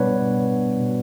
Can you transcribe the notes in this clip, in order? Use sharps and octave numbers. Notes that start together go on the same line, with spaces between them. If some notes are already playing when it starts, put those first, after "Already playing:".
Already playing: B2 G3 B3 D4 B4 C#5 D5
B3
B2